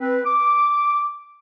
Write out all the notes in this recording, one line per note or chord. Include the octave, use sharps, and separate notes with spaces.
C4 B4
D6